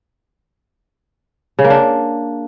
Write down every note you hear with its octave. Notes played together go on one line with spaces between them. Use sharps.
C#3
A#3
D4